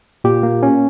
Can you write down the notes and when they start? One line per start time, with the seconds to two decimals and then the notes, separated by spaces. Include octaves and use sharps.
0.24 A#2 G4
0.43 A#3
0.63 C#4